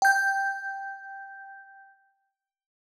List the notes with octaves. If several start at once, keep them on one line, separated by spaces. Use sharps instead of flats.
G5 G6